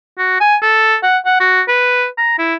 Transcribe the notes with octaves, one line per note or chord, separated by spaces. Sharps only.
F#4
G#5
A4
F#5
F#5
F#4
B4
A#5
E4